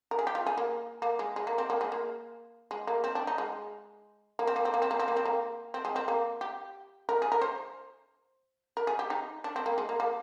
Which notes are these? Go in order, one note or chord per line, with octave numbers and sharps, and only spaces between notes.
A#4
G#4
G4
F4
G#4
A#3
A#3
G#3
G#3
A#3
C4
A#3
G#3
A#3
G#3
A#3
C4
D4
D#4
G#3
A#3
C4
A#3
C4
A#3
C4
A#3
C4
A#3
C4
A#3
C4
G#3
C4
A#3
G4
A#4
G#4
A#4
C5
A#4
G#4
G4
D#4
D4
C4
A#3
G#3
A#3
A#3